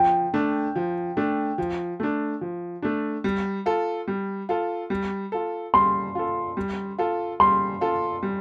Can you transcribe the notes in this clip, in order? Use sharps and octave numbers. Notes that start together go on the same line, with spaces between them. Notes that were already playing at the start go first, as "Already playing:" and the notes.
Already playing: F3 G5
A3 D4
F3
A3 D4
F3
A3 D4
F3
A3 D4
G3
F4 A4
G3
F4 A4
G3
F4 A4
G3 C6
F4 A4
G3
F4 A4
G3 C6
F4 A4
G3